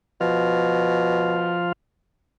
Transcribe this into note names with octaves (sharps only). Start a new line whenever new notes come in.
B2 F3 F4